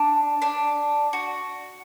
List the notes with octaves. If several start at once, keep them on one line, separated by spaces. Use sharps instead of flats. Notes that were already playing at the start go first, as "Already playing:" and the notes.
Already playing: D4
D4
F#4